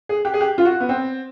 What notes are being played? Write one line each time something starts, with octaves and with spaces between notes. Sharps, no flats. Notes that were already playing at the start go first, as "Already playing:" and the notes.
G#4
G4
G#4
G4
F4
F#4
B3
C4